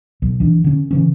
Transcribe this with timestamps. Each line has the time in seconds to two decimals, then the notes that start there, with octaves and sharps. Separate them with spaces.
0.22 B1
0.40 E3 D4
0.64 D3 C#4
0.91 C#3 E3 C#4